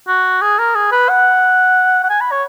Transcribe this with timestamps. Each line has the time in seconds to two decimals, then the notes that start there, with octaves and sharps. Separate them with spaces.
0.08 F#4
0.42 G#4
0.59 A#4
0.75 G#4
0.92 B4
1.09 F#5
2.04 F#5
2.10 G#5
2.21 B5
2.32 C#5